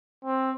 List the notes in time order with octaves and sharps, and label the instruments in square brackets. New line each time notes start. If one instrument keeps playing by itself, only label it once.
[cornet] C4